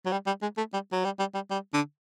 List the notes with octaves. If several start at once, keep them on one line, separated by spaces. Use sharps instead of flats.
F#3
G3
G3
G#3
A3
G3
F#3
G3
G3
G3
G3
D3